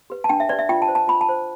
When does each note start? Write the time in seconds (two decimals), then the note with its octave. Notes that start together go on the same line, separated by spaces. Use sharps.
0.10 G4 B4
0.24 A5
0.29 D4 G5
0.40 E5
0.49 G4 B4 D5
0.59 E5
0.69 F4 G5
0.82 A5
0.88 C5
0.95 A5
1.08 F4 B5
1.21 A5
1.29 C5